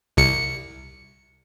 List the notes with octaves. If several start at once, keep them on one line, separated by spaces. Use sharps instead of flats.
C2 C#7